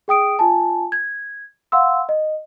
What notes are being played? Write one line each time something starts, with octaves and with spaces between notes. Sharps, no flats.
G#4 G5 D#6 D7
F4 G#5 A5
G#6
F5 F#5 C6 E6
D#5